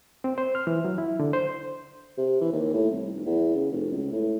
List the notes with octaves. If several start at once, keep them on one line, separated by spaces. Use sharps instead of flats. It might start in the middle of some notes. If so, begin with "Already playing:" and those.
C4
C5
F6
E3
F#3
E4
D3
C5
C3
E3
D#2
A2
C2
F1
E2
C#3
F1
C#2
A2